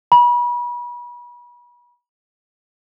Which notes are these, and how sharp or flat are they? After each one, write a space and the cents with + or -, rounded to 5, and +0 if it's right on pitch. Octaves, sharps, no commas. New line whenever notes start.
B5 -35